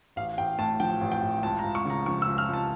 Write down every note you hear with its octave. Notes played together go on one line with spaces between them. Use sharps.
A1 F5
A1 G5
A2 A5
F3 G5
A1
G5
A1
C#2 A5
A#5
C#2
C#6
C#3 A#5
F3 C#6
E6
C#2
F6
C#2
A5